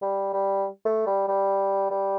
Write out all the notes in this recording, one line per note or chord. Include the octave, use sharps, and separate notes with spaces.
G3
G3
A3
G3
G3
G3